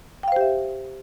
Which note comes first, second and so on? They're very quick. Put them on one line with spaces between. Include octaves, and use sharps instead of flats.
G5 F5 C5 G4 E5